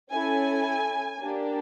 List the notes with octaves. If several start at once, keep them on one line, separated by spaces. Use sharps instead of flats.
C#4 E4 A4 G#5
A#3 D4 G4